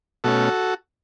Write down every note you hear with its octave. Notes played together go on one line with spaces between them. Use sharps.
B2 A3 C#4 F#4 A4